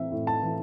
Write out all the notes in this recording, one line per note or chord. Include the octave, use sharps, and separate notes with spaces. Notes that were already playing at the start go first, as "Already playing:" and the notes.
Already playing: A2 E3 C4 E5
A2
A5
E3